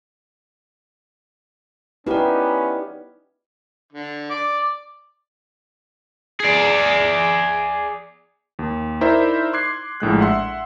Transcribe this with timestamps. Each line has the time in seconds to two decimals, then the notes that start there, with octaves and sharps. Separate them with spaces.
2.07 B3 C#4 D#4 E4 G4 B4 D5
3.93 D3
4.30 D5 D6
6.40 G#4 D5
8.59 D#2
9.01 D#4 E4 A#4 C5 D5 E5
9.53 C6 D6 F#6 G#6 C7
10.00 A#1 A2 G#3 F#6
10.19 E5 F#5 C6 E6